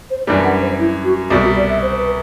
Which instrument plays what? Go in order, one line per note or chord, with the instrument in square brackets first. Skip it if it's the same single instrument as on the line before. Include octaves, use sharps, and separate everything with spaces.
[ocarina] C5
[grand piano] F#2 E3 G3 D4 [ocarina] D5
[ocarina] F#5
C5
E4
F#4
[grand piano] C2 B2 G3 [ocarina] F#4
[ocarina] F#4
D5
E5
C5
B4